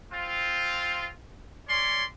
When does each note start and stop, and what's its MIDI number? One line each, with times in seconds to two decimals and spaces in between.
0.12 1.07 60
0.12 1.07 65
1.68 2.04 61
1.68 2.04 73
1.68 2.04 74
1.68 2.04 84